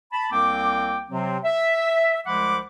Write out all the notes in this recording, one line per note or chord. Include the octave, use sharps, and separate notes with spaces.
A5 B5
C2 A#3 C4 G5 D6
C3 F#3 C4
E5
C2 F3 G#3 F#5 B5 D6